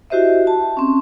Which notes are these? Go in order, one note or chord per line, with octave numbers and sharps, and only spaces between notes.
E4 F#4 G4 C5 D#5 E5
A5
C4 C#4